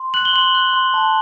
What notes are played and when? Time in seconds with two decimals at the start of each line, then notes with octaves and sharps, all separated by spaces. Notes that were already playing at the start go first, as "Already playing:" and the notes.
Already playing: C6
0.14 F#6 F#7
0.25 G7
0.33 C6 F#7
0.55 F#6
0.73 C6
0.94 A5